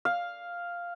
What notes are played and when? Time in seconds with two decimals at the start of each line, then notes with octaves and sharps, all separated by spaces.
0.05 F5